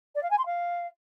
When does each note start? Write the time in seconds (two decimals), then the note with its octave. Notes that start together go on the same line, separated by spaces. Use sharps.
0.15 D5
0.23 F5
0.30 G#5
0.38 C6
0.46 F5